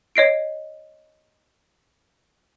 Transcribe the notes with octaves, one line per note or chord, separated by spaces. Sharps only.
C#5 D#5 C7 D7